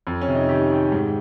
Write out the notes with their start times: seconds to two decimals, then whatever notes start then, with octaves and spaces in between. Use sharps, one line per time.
0.07 F2
0.21 C#4
0.28 C3
0.35 D#4
0.49 D#3 G4
0.70 D#3
0.92 G#2